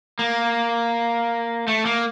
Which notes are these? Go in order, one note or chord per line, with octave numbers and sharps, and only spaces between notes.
A#3
A3
A#3